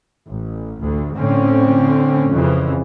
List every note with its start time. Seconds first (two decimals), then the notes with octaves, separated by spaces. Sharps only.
0.27 A1
0.82 D2
1.16 A2 D3 C4 C#4
2.31 F2 C#3 E3